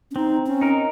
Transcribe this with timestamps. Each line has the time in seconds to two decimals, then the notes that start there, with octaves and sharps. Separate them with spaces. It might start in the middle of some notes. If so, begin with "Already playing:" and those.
0.11 C#4
0.16 C4 D#4
0.46 C#4
0.61 D#4 A#4